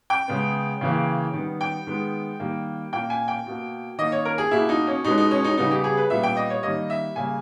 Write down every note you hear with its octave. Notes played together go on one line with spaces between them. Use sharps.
G5
C#3 G#3 B3
C#3 E3 A#3
D#3 G3 B3
G5
D#3 G#3 B3
D#3 G3 A#3
A#2 A#3 G5
G#5
G5
B2 A#3
D#3 A#3 D#5
C#5
A#4
G#4
B2 A#3 E4
D#4
C#4
B2 G#3 B3 D#4
D#4
C#4
D#4
C#3 G3 B3 D#4
G4
G#4
B4
A#2 G3 B3 E5
G5
D#5
C#5
D#3 G3 A#3 D#5
E5
C#3 G3 A#3 G#5